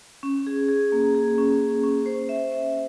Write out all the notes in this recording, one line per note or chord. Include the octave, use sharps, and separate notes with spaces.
C#4
G#4
G#4
A#3
G#4
C#4
G#4
C#4
C5
E5
E5